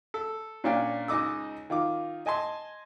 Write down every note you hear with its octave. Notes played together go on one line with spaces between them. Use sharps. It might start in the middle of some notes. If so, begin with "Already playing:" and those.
A4
A#2 C#4 D4 F5 G5
C#2 D#4 D#5 D6 E6
D#3 F4 D6
D#5 G#5 A5 C6